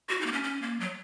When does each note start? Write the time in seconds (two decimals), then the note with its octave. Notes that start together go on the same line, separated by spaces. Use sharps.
0.09 F#4
0.21 D#4
0.26 A#3
0.32 C#4
0.44 C#4
0.62 A#3
0.80 F#3